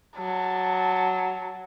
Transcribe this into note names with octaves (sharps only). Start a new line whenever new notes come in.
F#3 A5